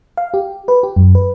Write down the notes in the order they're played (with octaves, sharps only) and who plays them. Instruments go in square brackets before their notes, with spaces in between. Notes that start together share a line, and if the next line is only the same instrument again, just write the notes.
[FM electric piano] F5
G4
B4
G4
F#2
B4